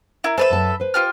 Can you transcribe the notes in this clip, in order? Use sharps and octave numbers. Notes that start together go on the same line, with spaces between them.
E4 A#4
A4 B4 C5 E5
F#2 A5
B4 C5
F4 G4 F6